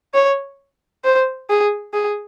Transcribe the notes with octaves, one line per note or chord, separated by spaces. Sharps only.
C#5
C5
G#4
G#4